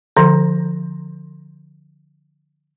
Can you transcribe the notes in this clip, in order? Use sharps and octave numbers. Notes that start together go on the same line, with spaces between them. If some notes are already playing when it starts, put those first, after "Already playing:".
D3 F3